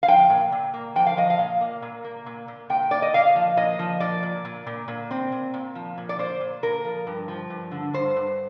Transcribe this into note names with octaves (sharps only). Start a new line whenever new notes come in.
F5
F3 G5
A#2
A#2
A#3
F3 G5
F5
F3 D#5
F5
A#2
A#3
A#2
A#3
A#2
A#2
A#2 G5
A#3 D5
D#5
A#2 F5
F3
A#2 D#5
F3
A#2 D5
A#2
A#2
A#2
A#2
C4
A#2
A#2
F3
A#2
D5
A#2 C5
A#2
A#2 A#4
F3
G2
F3
G2
D3
G2 C5
G2